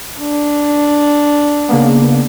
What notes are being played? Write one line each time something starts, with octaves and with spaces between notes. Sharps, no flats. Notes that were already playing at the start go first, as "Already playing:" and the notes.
D4
C#3 A#3 B3